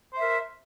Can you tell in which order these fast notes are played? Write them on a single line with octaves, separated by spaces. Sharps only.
C5 E5 A#4